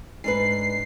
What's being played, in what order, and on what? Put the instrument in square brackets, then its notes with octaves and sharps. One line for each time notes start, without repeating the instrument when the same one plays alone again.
[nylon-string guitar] G#2 D4 B4 [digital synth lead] C7